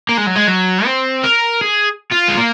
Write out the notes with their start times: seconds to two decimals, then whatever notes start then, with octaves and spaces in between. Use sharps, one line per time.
0.09 A#3
0.17 G#3
0.26 F#3
0.35 G#3
0.47 F#3
0.85 C4
1.23 A#4
1.61 G#4
2.12 F4
2.29 G#3
2.38 A#3